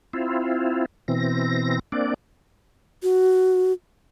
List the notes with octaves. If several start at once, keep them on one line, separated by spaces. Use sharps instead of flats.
C4 E4 F4
B2 E3 C4 A#6
A#3 C4 D4 D5
F#4